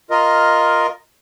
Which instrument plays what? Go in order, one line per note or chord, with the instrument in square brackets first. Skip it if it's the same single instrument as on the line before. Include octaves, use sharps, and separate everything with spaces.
[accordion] F4 A#4 D#5